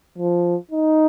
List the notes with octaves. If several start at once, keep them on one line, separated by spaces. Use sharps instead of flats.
F3
D#4